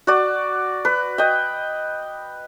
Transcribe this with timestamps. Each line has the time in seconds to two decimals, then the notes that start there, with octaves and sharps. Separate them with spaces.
0.07 F#4 D5
0.85 B4
1.18 D#5 G5